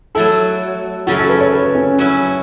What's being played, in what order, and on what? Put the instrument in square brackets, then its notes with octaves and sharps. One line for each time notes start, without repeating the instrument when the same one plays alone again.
[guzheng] F#3 A3 E4 [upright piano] A4
[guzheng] F#2 C#3 A3 [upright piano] F#4
[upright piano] A4
B4
C#5
B4
C#4
[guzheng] F#3 C#4 E4 B4